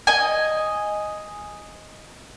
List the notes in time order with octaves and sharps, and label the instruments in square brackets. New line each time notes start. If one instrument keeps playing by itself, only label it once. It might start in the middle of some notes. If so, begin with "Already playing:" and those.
[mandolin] D#5 G#5